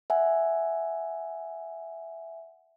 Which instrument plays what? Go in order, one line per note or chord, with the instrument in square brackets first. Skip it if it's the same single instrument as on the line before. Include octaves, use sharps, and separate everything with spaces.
[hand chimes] E5 F#5 G#5